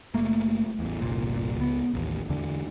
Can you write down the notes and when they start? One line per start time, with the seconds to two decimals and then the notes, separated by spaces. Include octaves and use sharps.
0.14 F#1 A3 A#3
0.79 A1 E2
1.01 G1 C2 A#2
1.58 C#2 B3
1.94 A1 D#2
2.29 E2 D3